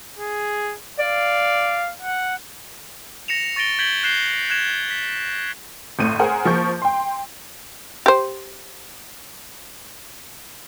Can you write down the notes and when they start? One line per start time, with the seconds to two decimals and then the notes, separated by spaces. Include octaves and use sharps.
0.19 G#4
0.99 D5 F5
2.02 F#5
3.28 A#6 C#7 E7 F7
3.56 C#6 A6 A#6 D7 G7
3.79 G6 G#6 B6 D7 F#7 G7
4.03 F#6 G6 C7 E7 G7
4.50 F#6 G#6 E7
4.91 B6
5.99 G1 A2 D#7
6.19 G#4 A#4 C5 F#5 G#5
6.45 F3 A#3 C#6 G6
6.82 G5 C6
8.06 G4 C5